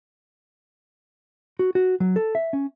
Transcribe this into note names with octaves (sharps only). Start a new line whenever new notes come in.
F#4
F#4
F#3
A4
E5
C#4